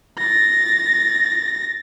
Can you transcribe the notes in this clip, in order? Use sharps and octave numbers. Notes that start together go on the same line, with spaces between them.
A6 A#6